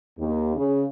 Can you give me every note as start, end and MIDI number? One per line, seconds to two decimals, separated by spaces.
0.19 0.53 39
0.56 0.84 49